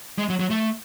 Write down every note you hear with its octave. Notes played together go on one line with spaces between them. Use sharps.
G#3
F#3
F#3
A3